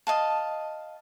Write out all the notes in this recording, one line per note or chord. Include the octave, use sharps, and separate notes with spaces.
D#5 F5 A5